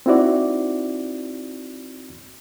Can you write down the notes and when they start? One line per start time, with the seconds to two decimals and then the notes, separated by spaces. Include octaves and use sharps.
0.06 C4 D#4 E4 F#4 D5